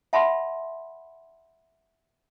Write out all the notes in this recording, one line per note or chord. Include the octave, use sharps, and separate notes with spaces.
E5 F#5 A5 B5 C6